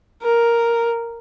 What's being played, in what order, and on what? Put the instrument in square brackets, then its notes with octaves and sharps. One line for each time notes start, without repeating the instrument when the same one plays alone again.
[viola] A#4